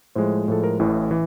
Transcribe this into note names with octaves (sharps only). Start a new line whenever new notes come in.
A2 F3 G#3 C5
A2 F3 G#3 A4
A#4
A1 A2 E3
E3